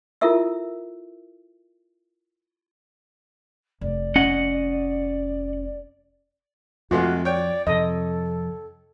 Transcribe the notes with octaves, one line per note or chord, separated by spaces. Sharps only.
E4 F4 A4 A#4 E5 E6
F1 D5
C#4 D#5 F#5
F2 C3 G#3 A3 F4 F#4
C#5 D5 G5
F2 C3 A4 D#5